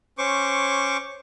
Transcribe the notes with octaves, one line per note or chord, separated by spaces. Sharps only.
C#4 C5 C#6 D6